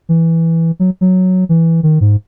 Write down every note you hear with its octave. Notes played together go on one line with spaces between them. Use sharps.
E3
F#3
F#3
E3
D#3
G#2